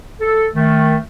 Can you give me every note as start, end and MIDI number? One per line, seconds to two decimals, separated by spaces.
0.20 0.46 69
0.54 0.96 51
0.54 0.96 57